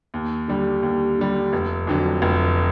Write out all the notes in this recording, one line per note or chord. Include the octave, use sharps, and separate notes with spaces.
D#2
D3 G3
D#2
D3 G3
F1
F2 D3 F#3
F1